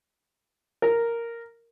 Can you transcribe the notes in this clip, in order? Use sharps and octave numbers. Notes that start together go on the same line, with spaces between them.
A#4